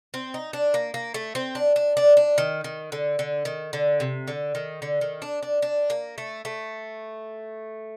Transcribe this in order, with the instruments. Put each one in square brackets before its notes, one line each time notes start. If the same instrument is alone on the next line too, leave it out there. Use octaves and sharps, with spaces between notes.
[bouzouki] C4
D#4
D4
A#3
A#3
A3
C4
D4
D4
D4
D4
D#3
D#3
D3
D3
D#3
D3
C3
D3
D#3
D3
D#3
D4
D4
D4
A#3
A3
A3